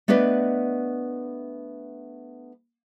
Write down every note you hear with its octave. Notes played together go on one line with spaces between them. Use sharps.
A3 B3 D4 B4 D5 D#5